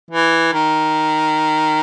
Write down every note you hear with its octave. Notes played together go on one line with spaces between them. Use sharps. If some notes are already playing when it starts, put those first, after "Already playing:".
E3
D#3